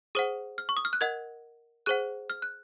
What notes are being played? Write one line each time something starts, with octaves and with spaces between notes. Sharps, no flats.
G#4 C5 F#5 D#6
F6
C#6
D#6
F6
F#6
A#4 D#5 F#5 G#6
G#4 C5 F#5 F#6
F6
F#6